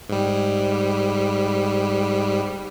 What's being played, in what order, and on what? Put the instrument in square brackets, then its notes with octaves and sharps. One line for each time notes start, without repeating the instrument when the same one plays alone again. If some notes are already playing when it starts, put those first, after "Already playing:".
[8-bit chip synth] G#2 G3